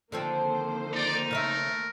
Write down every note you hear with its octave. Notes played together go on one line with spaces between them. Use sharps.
D3 D#3 F3 A#3 C4 C5
D#4 D5
C#3 A3 A#4 D5 E5